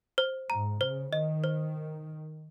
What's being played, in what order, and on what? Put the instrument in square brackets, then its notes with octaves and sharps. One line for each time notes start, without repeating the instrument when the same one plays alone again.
[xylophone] C5
[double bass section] G#2 [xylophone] A#5
[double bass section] C#3 [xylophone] C5
[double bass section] D#3 [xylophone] D#5
[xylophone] C5